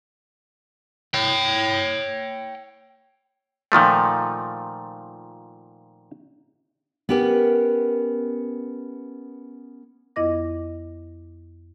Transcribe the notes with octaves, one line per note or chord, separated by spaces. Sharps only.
C#5 G5
A#2 D#3 F3 A3
B3 C#4 G4 A#4 B4
F2 B3 E4 D#5 D6 A#6